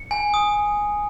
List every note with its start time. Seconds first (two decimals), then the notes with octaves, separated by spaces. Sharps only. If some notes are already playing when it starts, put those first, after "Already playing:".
Already playing: C#7
0.11 G#5
0.34 D#6